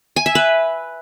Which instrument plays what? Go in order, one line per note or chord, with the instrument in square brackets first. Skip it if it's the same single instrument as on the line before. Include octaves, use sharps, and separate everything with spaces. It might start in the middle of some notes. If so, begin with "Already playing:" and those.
[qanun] G#5
E5
B4